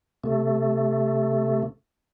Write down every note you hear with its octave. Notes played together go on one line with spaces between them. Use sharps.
C3 A3